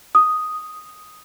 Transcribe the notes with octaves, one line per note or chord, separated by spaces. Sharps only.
D#6